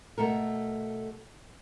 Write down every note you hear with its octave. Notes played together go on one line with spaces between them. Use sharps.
B2 A3 A4 A#4